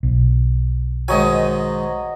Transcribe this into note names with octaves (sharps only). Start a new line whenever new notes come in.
B1
G#2 D#3 F#3 D#5 G#5